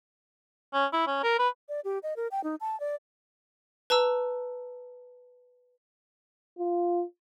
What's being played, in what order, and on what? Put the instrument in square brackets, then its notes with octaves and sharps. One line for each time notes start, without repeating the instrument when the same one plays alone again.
[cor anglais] C#4
E4
C#4
A#4
B4
[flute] D5
G4
D#5
A#4
G5
D#4
A5
D5
[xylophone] B4 A5 A#5 E6
[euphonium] F4